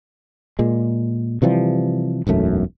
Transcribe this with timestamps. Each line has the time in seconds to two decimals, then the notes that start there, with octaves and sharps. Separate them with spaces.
0.59 A#2 G#3
1.42 C3 E3 F3 G3
2.27 E1 B1 F#2 A3